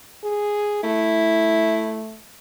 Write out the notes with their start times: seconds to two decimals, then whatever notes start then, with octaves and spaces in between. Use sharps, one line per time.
0.24 G#4
0.84 A3 E4